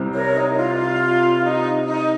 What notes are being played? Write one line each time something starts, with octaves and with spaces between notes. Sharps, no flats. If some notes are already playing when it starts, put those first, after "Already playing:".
Already playing: C2 C3 G3 C4
A#4 C#5
D#4
D#4
F4
D#4
D#4